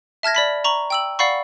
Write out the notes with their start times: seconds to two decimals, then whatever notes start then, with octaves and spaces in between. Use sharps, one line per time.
0.23 E5 A5 F6 G#6 A#6
0.35 D5 B5 B6
0.64 A#5 C#6 F#7
0.90 G5 E6 F#7
1.19 D5 F5 F#5 B5 C#6